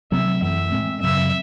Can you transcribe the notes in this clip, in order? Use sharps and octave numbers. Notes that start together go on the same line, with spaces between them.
C3 F#3 A3 C4 E5
F#2 E3 A3 E5
A2 G#3 C4
F#2 C#3 F#3 C4 E5